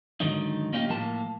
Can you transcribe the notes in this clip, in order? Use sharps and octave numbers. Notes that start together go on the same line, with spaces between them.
G#2 D3 D#3 F#3 D#4
A#3 C#4 D#4 F4 G4
A2 F3 A#3 A5